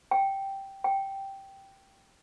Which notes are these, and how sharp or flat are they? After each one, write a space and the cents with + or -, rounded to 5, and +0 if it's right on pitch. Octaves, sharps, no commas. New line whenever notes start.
G5 -5
G5 -5